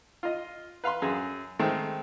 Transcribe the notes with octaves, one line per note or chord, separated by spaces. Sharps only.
F4 D#5
B4 F5 B5 C6
F#2 G#4 F5
D#3 G#3 A3 C4